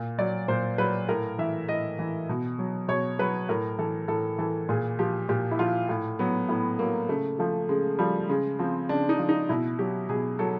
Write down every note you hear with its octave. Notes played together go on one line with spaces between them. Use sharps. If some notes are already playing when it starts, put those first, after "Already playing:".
Already playing: A#2
F#3 D5
A#2 C5
F#3 B4
A2 A#4
E3 E5
A2 D#5
E3
B2
F#3
B2 C#5
F#3 B4
A2 A#4
E3 A4
A2 A4
E3 A4
A#2 G#4
F3 G4
A#2 G4
E4
F3 F4
A2
F#3 B3
A2 B3
F#3 A#3
C#3 A3
F3 A3
C#3 G#3
F3 G3
C#3 G#3
F3 C4
C#3 D4
D#4
F3
D#4
B2 E4
F#3 G4
B2 G#4
F#3 A4